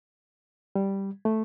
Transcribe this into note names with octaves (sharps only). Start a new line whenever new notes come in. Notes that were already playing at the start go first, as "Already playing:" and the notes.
G3
A3